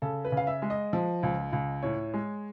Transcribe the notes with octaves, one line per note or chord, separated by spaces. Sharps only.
C#3 A4
B4
C#3
F5
E5
G#3
D#5
F3
C#2
C#2
A2 C#5
G#3